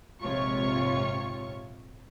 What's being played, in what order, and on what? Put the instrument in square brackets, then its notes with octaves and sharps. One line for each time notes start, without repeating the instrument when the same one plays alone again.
[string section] A#1 G#2 C3 F4 C#5 C#6